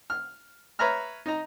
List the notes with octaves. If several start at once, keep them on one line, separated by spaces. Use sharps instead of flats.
F6
B4 C#5 E5 A#5 F6
D#4 A#5